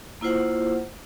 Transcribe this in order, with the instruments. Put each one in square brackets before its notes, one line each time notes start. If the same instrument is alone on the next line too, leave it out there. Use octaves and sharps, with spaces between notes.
[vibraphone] A#3 E4 F4 C5 F#5